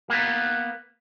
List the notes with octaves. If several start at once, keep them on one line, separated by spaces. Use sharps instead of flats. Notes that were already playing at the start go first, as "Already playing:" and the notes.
A#3 B3